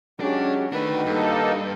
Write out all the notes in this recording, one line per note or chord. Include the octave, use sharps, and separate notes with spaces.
F#3 G#3 C#4 D4 G4
D#3 A3 D4 F#4 B4
G2 A#3 D#4 A4